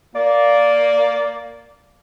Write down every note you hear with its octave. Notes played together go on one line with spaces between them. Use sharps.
A#3 D5